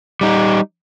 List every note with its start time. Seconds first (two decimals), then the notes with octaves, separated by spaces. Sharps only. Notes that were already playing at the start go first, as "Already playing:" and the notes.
0.21 G3 D#4